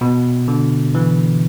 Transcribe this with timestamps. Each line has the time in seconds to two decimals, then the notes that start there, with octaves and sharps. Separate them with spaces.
0.01 B2
0.48 D3
0.95 E3